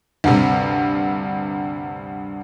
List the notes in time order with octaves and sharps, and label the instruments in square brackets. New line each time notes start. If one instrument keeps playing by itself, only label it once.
[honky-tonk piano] D2 G2 C3